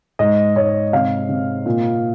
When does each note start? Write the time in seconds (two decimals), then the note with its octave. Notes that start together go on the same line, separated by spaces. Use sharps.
0.19 G#2 D#5
0.56 G#2 C#5
0.93 C3 F5
1.29 C3
1.66 A#2